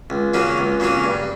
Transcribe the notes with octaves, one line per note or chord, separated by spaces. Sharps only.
C#2
C#3 F#3 A#3 C#4
C#2
C#3 F#3 A#3 C#4
G2